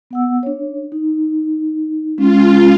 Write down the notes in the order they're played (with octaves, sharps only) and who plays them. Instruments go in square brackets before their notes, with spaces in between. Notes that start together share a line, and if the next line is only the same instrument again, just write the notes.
[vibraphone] B3 F#5 E6
D4 C#5
D#4
[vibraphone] G#3 C#4 [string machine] F4